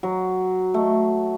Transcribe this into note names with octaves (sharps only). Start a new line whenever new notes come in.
F#3
A3